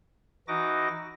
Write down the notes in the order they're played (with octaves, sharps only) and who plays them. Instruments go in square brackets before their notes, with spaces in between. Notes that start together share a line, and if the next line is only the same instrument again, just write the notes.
[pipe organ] E3 D#4 F#4 D#5 D6 A#6